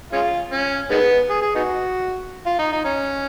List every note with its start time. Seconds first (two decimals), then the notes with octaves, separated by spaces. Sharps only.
0.13 G#3 C#4 F4
0.51 C#4
0.91 D#3 G#3 B3
1.30 G#4
1.42 G#4
1.55 B3 D#4 F#4
2.46 F4
2.59 D#4
2.72 D#4
2.84 C#4